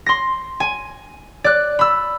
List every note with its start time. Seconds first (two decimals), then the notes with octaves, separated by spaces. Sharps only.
0.06 C6 A#6
0.60 G#5
1.44 D5 F#6
1.79 B5 E6